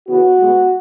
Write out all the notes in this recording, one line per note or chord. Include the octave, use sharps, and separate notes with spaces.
C#3 E3 B3 F#4
B2 G#3 B3